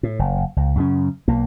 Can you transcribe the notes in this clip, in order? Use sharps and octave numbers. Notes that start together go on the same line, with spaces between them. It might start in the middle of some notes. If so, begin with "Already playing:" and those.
A2
F#1
C#2
F#2 C#3 C#4
B1 A#3